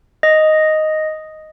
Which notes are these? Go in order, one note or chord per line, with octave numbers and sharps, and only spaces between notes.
D#5